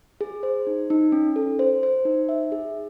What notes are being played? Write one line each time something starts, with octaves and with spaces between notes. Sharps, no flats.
G#4
C5
D#4
D#4
C#4
A4
C5
C5
D#4
E5
G#4